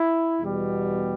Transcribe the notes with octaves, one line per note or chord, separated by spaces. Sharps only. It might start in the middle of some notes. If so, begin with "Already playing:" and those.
Already playing: E4
E2 B2 G3